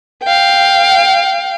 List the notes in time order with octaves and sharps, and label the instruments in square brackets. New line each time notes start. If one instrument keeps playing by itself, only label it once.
[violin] F5 G5